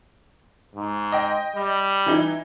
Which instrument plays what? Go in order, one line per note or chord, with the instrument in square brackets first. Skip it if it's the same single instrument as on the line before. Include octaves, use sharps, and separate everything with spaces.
[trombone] G#2
[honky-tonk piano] D#5 G5
[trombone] G3
[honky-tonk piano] E3 D#4 E4